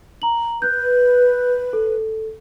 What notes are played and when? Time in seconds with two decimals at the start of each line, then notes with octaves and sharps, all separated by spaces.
0.22 A#5 F#7
0.62 B4 F#6 G6
1.73 A4